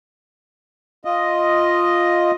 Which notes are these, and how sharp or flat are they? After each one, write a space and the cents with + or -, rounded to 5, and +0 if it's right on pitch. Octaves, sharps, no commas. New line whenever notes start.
F4 +0 D#5 +0